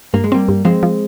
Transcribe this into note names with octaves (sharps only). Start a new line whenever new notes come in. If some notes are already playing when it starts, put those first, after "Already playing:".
G2 A#3
G#3
G3 A#3 C4
G2
F3 G#3 C4
F3